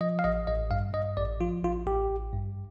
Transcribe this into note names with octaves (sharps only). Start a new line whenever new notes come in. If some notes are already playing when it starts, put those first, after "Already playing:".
F3 D#5
F5
A1 D#5
A1 D#5
G2 F5
G2 D#5
A1 D5
F3 F4
A1 F4
A1 G4
A1
G2